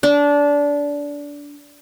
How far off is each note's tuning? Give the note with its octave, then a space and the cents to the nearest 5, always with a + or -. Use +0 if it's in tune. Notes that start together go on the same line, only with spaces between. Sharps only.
D4 -20